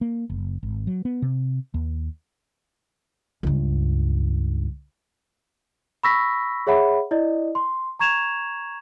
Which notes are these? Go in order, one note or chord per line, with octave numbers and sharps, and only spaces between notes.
A#3
F#1
G#1
F#3
B3
C3
D#2
C#2 G2
B5 C#6 E6 A#6 B6
G#4 C#5 E5 F#5 B5
E4 D5 D#5
C6
A#5 C#6 G#6 E7 F7